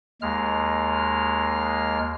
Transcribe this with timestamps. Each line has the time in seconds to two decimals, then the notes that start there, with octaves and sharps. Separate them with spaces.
0.22 D#2 G#3 F6